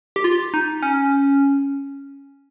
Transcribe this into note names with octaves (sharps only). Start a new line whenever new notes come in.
G4
F4
D#4
C#4